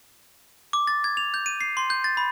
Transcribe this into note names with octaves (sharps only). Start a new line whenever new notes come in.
D6
A6
G#6
F7
G6
D#7
C7
C6
G6
A6
B5